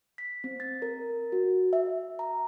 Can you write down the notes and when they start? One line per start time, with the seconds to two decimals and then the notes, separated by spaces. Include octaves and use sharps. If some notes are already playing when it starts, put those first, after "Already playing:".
0.18 B6
0.44 C4
0.60 A6
0.82 A#4
1.32 F#4
1.73 E5
2.19 A#5